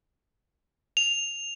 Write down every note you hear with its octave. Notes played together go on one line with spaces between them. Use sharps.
F7